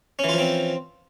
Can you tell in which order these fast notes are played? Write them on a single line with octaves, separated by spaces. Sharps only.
C#4 E3 F4 F3 C4